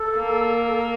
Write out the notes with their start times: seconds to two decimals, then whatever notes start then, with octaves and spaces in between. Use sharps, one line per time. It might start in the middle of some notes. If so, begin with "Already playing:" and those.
Already playing: A4
0.17 A#3
0.56 A#4
0.67 A4
0.78 A#4